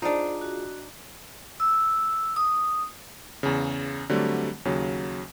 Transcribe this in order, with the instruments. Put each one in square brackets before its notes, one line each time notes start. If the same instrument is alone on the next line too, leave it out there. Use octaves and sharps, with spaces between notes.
[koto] D4 D#4 [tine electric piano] F4 G#4 [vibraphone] C5 D5 A5
[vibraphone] F#4
E6
D#6
[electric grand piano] E2 C#3
D3 F#3 G3 A3 C4
D#2 C#3 F#3